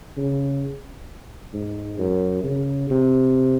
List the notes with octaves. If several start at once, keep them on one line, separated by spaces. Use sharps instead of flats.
C#3
G#2
F#2
C#3
C3